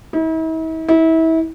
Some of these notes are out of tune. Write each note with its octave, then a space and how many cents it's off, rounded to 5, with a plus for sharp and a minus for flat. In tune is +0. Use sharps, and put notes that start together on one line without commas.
E4 -45
E4 -30